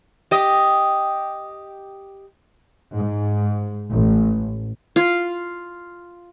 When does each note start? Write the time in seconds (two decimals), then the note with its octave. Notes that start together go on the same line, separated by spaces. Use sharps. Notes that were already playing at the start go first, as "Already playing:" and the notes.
0.31 G4 D#5
2.94 G#2
3.91 A1
4.96 F4